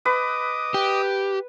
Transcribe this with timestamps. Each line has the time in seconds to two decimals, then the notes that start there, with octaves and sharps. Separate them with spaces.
0.06 B4 D#5 D6 D#6
0.74 G4